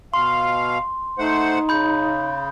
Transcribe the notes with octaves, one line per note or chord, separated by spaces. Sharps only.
B2 F5 C6
A3 D#4 C5 F#5
C#3 B5 G6